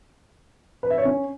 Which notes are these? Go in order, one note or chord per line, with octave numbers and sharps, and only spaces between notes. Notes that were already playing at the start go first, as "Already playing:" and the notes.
B4
E5
C#5
C#4